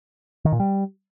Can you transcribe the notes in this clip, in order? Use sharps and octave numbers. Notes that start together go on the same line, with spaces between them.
D#3
A#2
G3